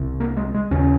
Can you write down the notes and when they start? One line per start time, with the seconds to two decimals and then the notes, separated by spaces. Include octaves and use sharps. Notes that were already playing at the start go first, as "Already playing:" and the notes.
Already playing: C2 C3
0.20 A#3
0.37 G#3
0.54 G#3
0.71 D#2 C#3 C#4